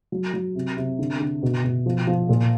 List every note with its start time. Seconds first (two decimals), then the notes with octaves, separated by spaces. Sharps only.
0.12 F#3
0.34 F#3
0.55 C3
0.77 C3
0.99 D3
1.20 D3
1.43 B2
1.64 B2
1.86 F3
2.07 F3
2.29 A#2